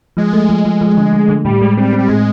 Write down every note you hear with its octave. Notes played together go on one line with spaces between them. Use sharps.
F3 G#3
A3
F3
F3
F3
D3
D3
D3
A2 G3
G#3
G3 C4
C4
G3
A2 G#3